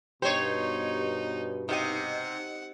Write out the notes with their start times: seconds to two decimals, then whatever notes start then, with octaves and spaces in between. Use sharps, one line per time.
0.22 G2 B2 D#4 G4 C5 C#5
1.69 C3 D#4 G4 D#5 F#5